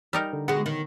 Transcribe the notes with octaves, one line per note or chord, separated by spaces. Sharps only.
G3 D#4 A#4
D3
G#3 B3 F#4
D#3